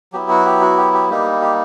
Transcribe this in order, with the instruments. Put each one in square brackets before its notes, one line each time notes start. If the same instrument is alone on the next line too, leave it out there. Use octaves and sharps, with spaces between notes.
[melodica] F#3 B3 E4 G4
F#4
G4
F#4
G4
G4
G3 A#3 D#4 G4
G4